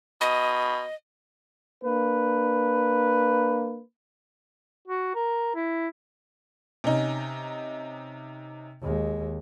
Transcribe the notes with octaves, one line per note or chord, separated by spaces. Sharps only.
B2 D#5
A#3 D4 B4
F#4
A#4
E4
C3 C#4 D#4
D#2 G#3